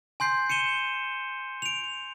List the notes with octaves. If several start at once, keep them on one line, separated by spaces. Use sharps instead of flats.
G#5 C6 G6 C7
C#7 D#7 E7 G7
D7 F7